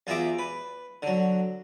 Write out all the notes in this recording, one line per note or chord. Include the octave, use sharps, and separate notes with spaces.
E2 F4 F#4 G#4 E5 D6
B4
D3 F#3